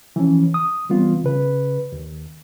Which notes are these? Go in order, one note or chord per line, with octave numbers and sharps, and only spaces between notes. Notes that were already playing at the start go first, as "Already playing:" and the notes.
E3 F3 C#4
D#6
E3 G3 B3 C4 F4
C#3 B4
D#2